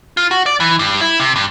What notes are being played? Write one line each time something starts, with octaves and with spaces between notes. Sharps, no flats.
F4
F#4
D5
E3
G2
E4
C3
G2